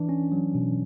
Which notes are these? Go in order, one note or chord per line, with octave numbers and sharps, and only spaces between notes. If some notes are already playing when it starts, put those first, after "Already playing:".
Already playing: E3 D4
C#4
F#3
B2